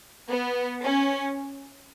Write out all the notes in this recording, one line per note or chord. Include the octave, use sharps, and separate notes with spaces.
B3
C#4